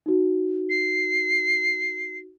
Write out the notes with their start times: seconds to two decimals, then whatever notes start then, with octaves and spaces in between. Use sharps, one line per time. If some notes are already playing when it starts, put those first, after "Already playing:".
0.06 D#4 F#4
0.70 C7